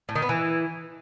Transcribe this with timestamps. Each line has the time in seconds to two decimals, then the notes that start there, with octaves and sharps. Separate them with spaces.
0.09 A2
0.15 D#3
0.22 B3
0.29 E3